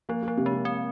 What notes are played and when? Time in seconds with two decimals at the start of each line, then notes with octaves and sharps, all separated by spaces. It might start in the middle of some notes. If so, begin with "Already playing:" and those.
0.09 F3 A#3
0.23 A#3
0.28 F3
0.37 C3
0.46 G#3
0.52 C3
0.65 C4